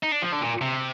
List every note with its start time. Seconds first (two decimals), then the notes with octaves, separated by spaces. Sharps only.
0.03 D#4
0.12 D4
0.22 F3
0.32 D3
0.42 A#2
0.61 C3